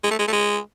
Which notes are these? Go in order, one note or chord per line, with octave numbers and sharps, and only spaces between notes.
G#3
A3
G#3
A3
G#3